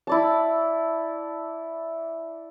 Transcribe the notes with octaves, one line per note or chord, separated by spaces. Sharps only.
E4 D5 A5